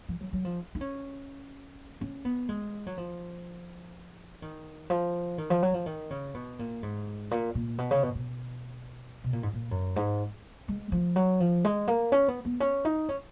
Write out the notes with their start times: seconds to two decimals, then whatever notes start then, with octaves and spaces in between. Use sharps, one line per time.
0.09 F3
0.21 F#3
0.33 F#3
0.45 F3
0.75 D#4
0.81 C#4
2.01 C#4
2.25 B3
2.49 G#3
2.86 F#3
2.98 F3
4.42 D#3
4.90 F3
5.38 D#3
5.50 F3
5.62 F#3
5.74 F3
5.86 D#3
6.10 C#3
6.34 B2
6.59 A#2
6.83 G#2
7.31 A#2
7.55 A#2
7.78 B2
7.91 C#3
8.03 B2
8.15 B2
9.24 B2
9.33 A#2
9.43 G#2
9.53 A#2
9.71 F#2
9.96 G#2
10.68 G#3
10.92 F3
11.16 F#3
11.40 F3
11.65 G#3
11.88 A#3
12.12 C#4
12.28 B3
12.45 B3
12.60 C#4
12.85 D#4
13.09 C#4